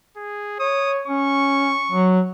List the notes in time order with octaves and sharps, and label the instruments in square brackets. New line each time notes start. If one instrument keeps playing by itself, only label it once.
[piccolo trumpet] G#4
[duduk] C#5 [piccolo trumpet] D#6
[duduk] C#4 [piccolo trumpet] C#6
[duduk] F#3